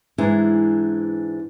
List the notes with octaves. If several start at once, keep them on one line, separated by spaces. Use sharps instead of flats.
G#2 E3 D4 G#4 E5